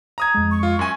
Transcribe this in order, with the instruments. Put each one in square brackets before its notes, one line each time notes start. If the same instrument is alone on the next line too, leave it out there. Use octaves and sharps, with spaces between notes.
[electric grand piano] A#5 D#6 G#6
[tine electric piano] F2 G#3
[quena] C#6
[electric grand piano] F4
[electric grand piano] F#2 G#5 [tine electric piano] C6